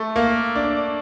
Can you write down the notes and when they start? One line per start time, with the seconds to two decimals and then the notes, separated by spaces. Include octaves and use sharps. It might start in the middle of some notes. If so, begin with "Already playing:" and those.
Already playing: A3
0.16 A#3
0.56 D4